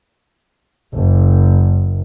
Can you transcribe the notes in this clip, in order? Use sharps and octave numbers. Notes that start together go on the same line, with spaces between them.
F#1